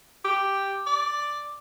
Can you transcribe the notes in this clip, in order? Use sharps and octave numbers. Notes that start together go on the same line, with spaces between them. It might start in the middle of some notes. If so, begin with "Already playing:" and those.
G4
D5